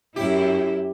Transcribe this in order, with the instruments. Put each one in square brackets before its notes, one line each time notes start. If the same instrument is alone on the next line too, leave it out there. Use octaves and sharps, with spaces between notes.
[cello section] F#2 E4 [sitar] G4